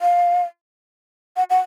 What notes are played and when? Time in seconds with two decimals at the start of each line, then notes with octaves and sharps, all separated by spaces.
0.01 F5
1.37 F#5
1.50 F#5